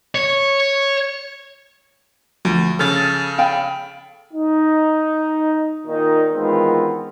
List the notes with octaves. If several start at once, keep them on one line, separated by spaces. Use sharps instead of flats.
C#5
D2 F3
C#3 A4 F6 A6
F5 G5 B5
D#4
A#2 D#3 D#4
D#3 E3 G#3 B3 C4 F4